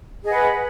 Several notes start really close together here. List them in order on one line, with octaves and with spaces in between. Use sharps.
G#4 D#5 F#5 B4